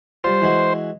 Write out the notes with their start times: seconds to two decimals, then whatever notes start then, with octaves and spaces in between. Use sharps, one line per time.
0.24 G3 F4 C5
0.42 E3 G#3 F#4